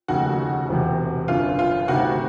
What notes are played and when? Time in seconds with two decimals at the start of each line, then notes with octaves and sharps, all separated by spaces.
0.08 F1 D#2 C#3 F#4
0.69 E1 E2 C3
1.28 G1 F#2 D3 F4
1.59 F4
1.88 D2 C3 D#3 F#4